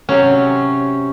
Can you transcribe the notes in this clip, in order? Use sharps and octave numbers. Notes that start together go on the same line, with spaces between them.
C3 F#3 C#4